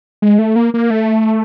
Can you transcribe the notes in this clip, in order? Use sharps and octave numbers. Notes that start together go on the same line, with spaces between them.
G#3
A3
A#3
A#3
A3